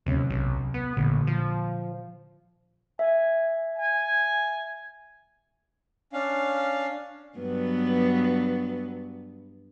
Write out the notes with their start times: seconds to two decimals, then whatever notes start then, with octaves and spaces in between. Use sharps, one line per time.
0.06 D1 D#2 C3 C#4
0.30 B1
0.74 B3
0.97 A1 A#2 D3
1.27 F3
2.99 E5 G#5
3.76 G#5
6.13 C#4 D4 F5
7.38 G2 F#3 B3